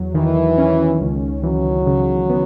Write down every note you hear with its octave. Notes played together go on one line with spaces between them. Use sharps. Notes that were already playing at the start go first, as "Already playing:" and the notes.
Already playing: E2 F#3
D#3 E3
C#4
C#2
E3 F#3
C#3
B3